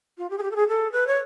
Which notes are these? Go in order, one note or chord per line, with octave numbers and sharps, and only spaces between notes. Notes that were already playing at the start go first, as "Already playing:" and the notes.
F4
G4
G#4
G4
A4
G#4
A4
B4
C#5